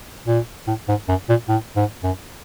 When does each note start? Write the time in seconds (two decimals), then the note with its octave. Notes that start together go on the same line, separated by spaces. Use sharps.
0.27 A#2
0.67 A2
0.89 G#2
1.08 F#2
1.29 A#2
1.49 A2
1.76 G#2
2.03 F#2